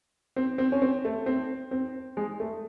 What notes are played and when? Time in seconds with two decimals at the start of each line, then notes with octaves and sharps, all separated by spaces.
0.36 C4
0.58 C4
0.72 C#4
0.82 C4
1.05 A3
1.26 C4
1.71 C4
2.17 G#3
2.40 A3